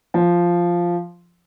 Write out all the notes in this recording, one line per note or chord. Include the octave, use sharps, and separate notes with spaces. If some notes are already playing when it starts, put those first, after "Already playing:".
F3